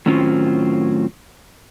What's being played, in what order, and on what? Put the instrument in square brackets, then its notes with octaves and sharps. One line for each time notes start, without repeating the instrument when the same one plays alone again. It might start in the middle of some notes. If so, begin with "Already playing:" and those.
[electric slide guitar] A2 D#3 F#3 C4 C#4 F4